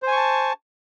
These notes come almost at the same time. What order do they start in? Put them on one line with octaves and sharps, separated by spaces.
C5 G#5 C#6 A5